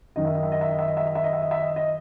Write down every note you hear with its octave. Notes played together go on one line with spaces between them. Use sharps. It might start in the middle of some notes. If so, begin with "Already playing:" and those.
F#2 D#3 D#5
E5
D#5
E5
D#5
E5
D#5
E5
D#5
E5
D#5
E5
D#5
E5
D#5
E5
D#5
D#5